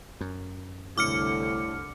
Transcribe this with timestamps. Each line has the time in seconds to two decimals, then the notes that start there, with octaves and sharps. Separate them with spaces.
0.21 F#2
0.98 C2 A2 D3 D6 F6 C#7